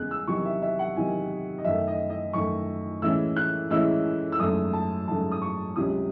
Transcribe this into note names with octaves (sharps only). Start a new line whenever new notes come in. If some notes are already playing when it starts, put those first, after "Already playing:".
Already playing: E2 C#3 G#3 F#6
E6
E2 C3 D#3 F#3 C#6
E5
E5
F#5
E2 C3 D#3 F#3 G#5
D#5
F#2 D#3 A3 E5
D#5
D#5
F#2 D#3 A3 C#6
A2 E3 G#3 C#4 E4 E6
F#6
A2 E3 G#3 C#4 E4 E6
E6
G#1 F#2 C#3 F#3 A3 D#6
A5
G#1 F#2 C#3 F#3 A3 A5
D#6
C#6
C#2 C3 F#3 C#4 D#6